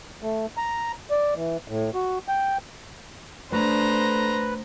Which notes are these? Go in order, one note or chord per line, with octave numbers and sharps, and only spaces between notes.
A3
A#5
D5
E3
A2
F#4
G5
A3 D4 B4 C5 A#5